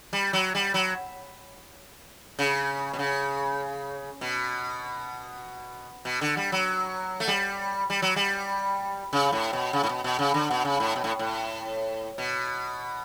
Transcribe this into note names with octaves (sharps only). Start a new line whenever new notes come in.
G3
F#3
G3
F#3
C#3
B2
C#3
B2
B2
D3
G3
F#3
A3
G3
G3
F#3
G3
C#3
A2
B2
C#3
A2
B2
B2
C#3
D3
B2
C#3
A2
B2
A2
A2
B2